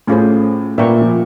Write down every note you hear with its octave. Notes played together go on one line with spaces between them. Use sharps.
A2 C#4 F4 G#4 C5
A#2 B4 E5 G5 A#5 C#6
F3